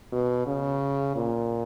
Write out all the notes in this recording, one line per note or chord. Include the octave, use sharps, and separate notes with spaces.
B2
C#3
A#2